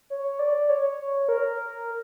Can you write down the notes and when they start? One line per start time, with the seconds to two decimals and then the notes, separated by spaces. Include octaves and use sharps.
0.10 C#5
0.39 D5
0.69 C#5
1.29 A#4